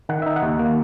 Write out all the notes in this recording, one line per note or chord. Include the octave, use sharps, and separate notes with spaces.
D#3 F#5
D#4 E5
F#5
D#2
A#3